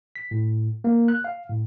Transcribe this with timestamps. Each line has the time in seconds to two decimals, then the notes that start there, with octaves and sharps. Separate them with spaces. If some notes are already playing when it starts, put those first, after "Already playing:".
0.16 B6
0.31 A2
0.84 A#3
1.08 F#6
1.24 F5
1.49 A2